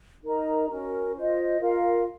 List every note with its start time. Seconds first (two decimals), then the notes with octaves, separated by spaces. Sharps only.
0.24 D#4 A#4 D#5 A#5
0.69 C#4 F#4 A#4
1.15 F4 C5 D#5
1.60 F4 A#4 F5